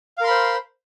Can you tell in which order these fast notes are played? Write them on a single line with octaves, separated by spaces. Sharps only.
F5 A#4 C6 B5 C5